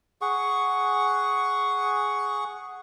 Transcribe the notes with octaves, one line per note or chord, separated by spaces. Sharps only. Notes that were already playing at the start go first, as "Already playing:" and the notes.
G#4 F#5 C#6